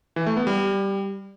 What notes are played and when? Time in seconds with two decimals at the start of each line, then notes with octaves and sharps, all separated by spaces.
0.16 E3
0.26 A3
0.37 B3
0.47 G3